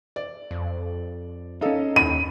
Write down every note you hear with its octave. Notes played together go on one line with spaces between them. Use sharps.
D5
F2
C#4 D#4 A4 D#5 F5
D#2 B5 D#7